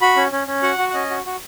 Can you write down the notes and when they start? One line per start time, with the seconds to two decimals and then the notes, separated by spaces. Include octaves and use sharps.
0.01 F#4 B5
0.16 C#4
0.32 C#4
0.47 C#4
0.63 F#4 F#5
0.78 F#4
0.90 F#5
0.94 C#4 D#5
1.10 F#4
1.26 F#4